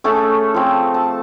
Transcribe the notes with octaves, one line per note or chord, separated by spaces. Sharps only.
A3 C#4 G#4 A4
F3 C4
A5